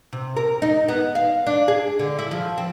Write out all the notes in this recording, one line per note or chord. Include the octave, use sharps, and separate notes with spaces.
C3
A#4
D#4
B3
F5
D4
G#4
D3
E4
F3
C4